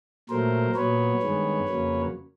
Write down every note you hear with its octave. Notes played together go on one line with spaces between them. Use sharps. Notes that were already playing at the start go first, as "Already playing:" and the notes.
A#2 F#3 A3 A#4 C5
A#2 F#3 B3 B4 C#5
G2 D#3 G#3 B3
F2 C#3 F#3 A#3